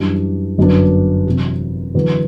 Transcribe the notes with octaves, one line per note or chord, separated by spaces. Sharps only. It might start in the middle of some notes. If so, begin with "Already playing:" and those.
Already playing: F#2 E3 G3 D4
G1 F#2 F#3 B3 D4
E2 C3 F#3
E2 D3 F#3 B3